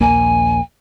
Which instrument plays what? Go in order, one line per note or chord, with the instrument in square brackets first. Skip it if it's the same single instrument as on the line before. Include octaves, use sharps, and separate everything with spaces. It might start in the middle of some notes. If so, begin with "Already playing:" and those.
[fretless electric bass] A#1 D#2 A#3 [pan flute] G#5